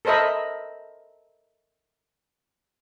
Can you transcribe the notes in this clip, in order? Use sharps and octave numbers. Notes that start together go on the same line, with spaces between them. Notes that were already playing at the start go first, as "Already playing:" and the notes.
A4 A#4 C5 D#5 E5 B5